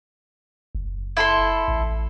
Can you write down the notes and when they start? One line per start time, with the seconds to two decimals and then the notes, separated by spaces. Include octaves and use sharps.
0.75 F#1
1.17 E4 A4 C6
1.68 A1